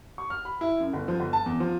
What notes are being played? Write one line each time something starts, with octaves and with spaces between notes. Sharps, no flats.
C#6
F6
B5
E4
F#2
G1
F3
G1
A5
E2
F3